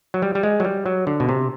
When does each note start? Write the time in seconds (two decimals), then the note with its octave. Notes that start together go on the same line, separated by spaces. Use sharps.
0.14 F#3
0.22 G3
0.35 G3
0.43 G#3
0.60 F#3
0.65 G3
0.86 F#3
1.07 D3
1.20 B2
1.29 C3